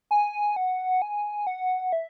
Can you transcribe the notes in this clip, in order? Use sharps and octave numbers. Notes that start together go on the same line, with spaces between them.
G#5
F#5
G#5
F#5
E5